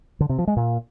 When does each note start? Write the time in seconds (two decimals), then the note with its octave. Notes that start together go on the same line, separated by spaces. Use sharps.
0.20 D3
0.29 C3
0.38 F3
0.47 G#3
0.56 A#2